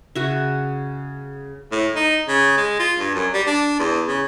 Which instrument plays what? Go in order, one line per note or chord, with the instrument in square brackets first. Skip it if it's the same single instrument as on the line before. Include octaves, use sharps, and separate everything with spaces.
[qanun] C#3 F#4 E5
[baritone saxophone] A2
D#4
C#3
G#3
F4
G2
F#2
G3
D4
E2
C#3